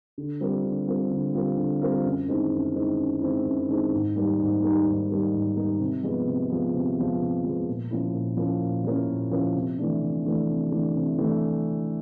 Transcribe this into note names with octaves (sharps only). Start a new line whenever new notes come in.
D3
G3 C4 F4 A#4
D3
G3 C4 F4 A#4
D3
G3 C4 F4 A#4
D3
G3 C4 F4 A#4
F#2
D#3 G#3 C4 E4
F#2
D#3 G#3 C4 E4
F#2
D#3 G#3 C4 E4
F#2
D#3 G#3 C4 E4
G#2
D#3 G3 A#3 D#4
G#2
D#3 G3 A#3 D#4
G#2
D#3 G3 A#3 D#4
G#2
D#3 G3 A#3 D#4
C3
F3 G#3 B3
C3
F3 G#3 B3
C3
F3 G#3 B3
C3
F3 G#3 B3
A#2
F3 A#3 C#4 E4
A#2
F3 A#3 C#4 E4
A#2
F3 A#3 C#4 E4
A#2
F3 A#3 C#4 E4
C3
E3 A3 D4
C3
E3 A3 D4
C3
E3 A3 D4
C3
E3 A3 D4